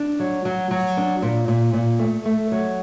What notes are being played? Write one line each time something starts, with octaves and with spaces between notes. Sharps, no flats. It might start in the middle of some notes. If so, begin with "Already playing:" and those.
Already playing: D4
F#3
F#3
F#3
D4
A#2
A#2
A#2
A3
A3
F#3